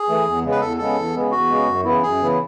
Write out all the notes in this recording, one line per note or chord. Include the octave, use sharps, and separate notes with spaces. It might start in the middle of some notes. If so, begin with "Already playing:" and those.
Already playing: G#4
E3 A3
E2
C#3 G#3 B3
B4
E2 A4
C#3 G#3 B3 A4
E2
C#3 G#3 B3
E2 F#4
C#3 G#3 B3
F#2
C#3 E3 B3 E4
F#2 G#4
C#3 E3 B3 E4